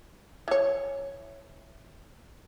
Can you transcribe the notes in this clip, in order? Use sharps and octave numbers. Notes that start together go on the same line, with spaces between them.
E3 C#5